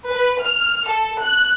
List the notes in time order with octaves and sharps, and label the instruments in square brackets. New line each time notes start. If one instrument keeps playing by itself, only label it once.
[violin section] B4
F6
A4
F#6